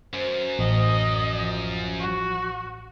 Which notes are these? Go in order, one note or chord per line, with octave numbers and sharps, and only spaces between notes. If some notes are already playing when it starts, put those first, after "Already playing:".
F#2 C5
A1 D#5
F3
F#4